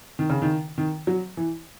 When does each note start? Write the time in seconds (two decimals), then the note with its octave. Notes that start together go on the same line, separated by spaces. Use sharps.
0.19 D#3
0.30 C#3
0.42 D#3
0.78 D#3
1.07 F#3
1.37 E3